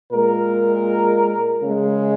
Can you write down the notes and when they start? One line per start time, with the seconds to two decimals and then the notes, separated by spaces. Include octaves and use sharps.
0.12 A#2 G#3 A#4
1.63 C#3 G#3